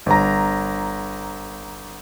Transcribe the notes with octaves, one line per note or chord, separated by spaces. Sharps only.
G1 A#5